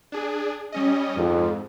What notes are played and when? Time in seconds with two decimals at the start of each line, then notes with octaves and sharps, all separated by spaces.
0.12 D4 G#4
0.72 G3 C#4 D#5
1.17 F2 G#2